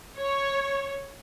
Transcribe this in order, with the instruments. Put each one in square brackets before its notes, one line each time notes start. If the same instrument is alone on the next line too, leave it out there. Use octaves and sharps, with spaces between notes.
[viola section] C#5